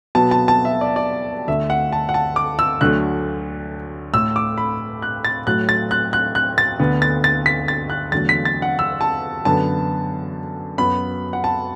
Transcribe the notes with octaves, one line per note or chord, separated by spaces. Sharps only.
B2 F#3 B3 A5
A5
A5
E5
D5
E5
D5
D2 D3 A3 E5
F#5
A5
F#5
A5
D6
E6
D2 D3 F#3 A3 F#6
A2 A3 E6
D6
B5
F#6
A6
A2 F#3 A3 F#6
A6
F#6
F#6
F#6
A6
D2 D3 B3
A6
A6
B6
A6
F#6
E2 D3 F#3 A3 A6
B6
A6
F#5
E6
A5
F#2 D3 B3 A5
F#2 F#3 B3 B5
F#5
A5